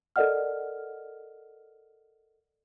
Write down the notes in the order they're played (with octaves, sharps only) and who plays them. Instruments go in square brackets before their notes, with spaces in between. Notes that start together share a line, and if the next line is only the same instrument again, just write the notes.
[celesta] A4 A#4 D5 D#5 F#5 F6